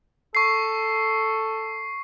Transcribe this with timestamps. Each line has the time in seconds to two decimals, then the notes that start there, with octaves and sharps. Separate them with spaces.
0.35 A4 C#6 C7